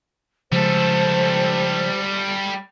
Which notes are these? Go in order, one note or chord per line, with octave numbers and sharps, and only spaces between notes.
C#3 F3 G3 G#3 A4 C5